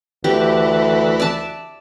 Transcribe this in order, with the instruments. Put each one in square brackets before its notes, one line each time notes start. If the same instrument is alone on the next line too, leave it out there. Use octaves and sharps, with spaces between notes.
[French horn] D2 [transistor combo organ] E3 B4 [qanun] G4
[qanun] D5 E5 A5